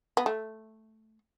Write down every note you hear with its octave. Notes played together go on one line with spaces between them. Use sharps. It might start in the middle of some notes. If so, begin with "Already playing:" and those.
B3
A3